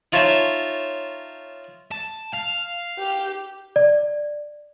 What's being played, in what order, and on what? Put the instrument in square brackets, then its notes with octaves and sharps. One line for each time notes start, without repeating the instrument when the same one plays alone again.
[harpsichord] D#4 F4 C#5 E5 A5
[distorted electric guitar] A5
F5
[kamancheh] G4
[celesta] D5